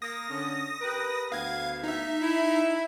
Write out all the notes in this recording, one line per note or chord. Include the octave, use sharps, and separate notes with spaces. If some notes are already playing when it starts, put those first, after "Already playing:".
A#3 D#6 A#6
D3 C#4
G4 A#4 B4
D2 B3 F5 G#6
D#4 E5
E4